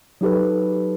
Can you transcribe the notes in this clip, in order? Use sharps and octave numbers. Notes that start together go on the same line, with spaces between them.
F#3 D#4 G4 A4 B4